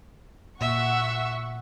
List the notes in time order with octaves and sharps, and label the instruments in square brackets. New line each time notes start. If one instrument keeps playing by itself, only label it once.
[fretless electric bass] A#2 [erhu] E5 [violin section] F#5 C#6